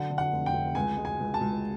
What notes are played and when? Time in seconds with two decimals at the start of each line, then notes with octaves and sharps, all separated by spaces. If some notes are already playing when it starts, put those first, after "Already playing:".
Already playing: D3 F#3 F#5
0.10 D3
0.18 F#5
0.32 F1
0.46 G5
0.53 F1
0.75 C#2 G#5
0.97 G#3
1.05 G#5
1.20 C#2
1.34 A5
1.41 C#2